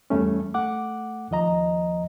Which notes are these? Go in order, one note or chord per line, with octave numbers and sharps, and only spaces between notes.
E2 G3 A3 C#4
A3 F#5 D6
D#2 F3 D#5 A#5